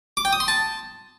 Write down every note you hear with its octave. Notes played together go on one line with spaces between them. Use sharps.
D6
G5
D#6
C6
A5